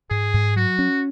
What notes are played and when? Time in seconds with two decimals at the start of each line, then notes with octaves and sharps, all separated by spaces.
0.10 G#2 G#4
0.34 G#2
0.56 F#3 F#4
0.79 C#4